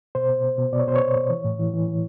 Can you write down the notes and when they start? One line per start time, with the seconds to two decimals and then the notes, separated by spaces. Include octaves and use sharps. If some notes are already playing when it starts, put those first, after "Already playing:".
0.15 B2 C5
0.29 B2
0.44 B2
0.58 B2
0.72 B2 D5
0.80 C#5
0.87 B2 C5
0.96 C#5
1.02 B2
1.16 B2
1.30 E3
1.44 A2
1.59 E3
1.74 E3
1.88 E3